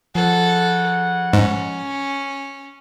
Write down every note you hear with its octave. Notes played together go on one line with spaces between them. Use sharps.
C#3 F3 A4 F#5
G#2 C#4